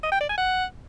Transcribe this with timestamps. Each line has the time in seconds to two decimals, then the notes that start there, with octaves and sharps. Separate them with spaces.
0.03 D#5
0.12 G5
0.20 D5
0.29 G#5
0.38 F#5